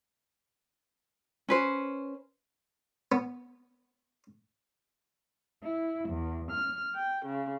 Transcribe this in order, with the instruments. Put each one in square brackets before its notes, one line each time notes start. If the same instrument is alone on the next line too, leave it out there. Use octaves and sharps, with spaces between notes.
[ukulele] C#4 B4 C5
[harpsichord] B3
[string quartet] E4
E2
F6
G5
C#3